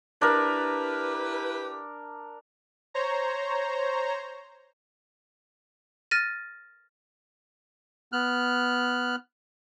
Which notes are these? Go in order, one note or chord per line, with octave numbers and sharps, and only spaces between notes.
D4 E4 G4 A#4 B4
C5 C#5 A#5
F6 A6 A#6 D#7
B3 F6 F#6